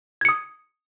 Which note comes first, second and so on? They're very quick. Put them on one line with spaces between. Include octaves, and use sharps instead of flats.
G#6 C#7 D#6